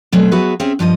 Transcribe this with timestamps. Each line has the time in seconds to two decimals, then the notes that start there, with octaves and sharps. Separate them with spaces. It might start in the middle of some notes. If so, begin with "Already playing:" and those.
0.12 B2 F#3 A3 C4
0.32 F#3 B3 F#4 G#4 B4 E5
0.60 C4 C#4 G#4 E5
0.79 G2 F3 A#4 D#5